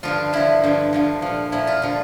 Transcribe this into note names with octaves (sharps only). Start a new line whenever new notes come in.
G2 D3 F3 F4
G2 D3 F3 E4
G2 D3 F3
G2 D3 F3
A#2 F3
A#2 F3 E4
F4
D3 F3 F4